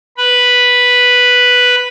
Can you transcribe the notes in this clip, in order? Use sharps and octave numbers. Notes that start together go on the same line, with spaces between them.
B4 B5